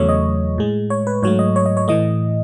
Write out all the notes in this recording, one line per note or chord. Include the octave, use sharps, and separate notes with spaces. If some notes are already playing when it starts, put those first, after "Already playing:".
Already playing: E2 C#3 F#3 A3 C#5
D#5
A2 G#3
C#5
B4
G#2 F#3 A3 C#5
D#5
C#5
D#5
C#5
A2 E3 A3 D#5